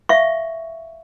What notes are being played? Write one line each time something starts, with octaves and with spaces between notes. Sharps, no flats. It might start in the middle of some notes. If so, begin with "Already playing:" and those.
E5 F5 C#6